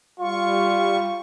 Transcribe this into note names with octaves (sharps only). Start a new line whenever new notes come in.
G3 F4 C#6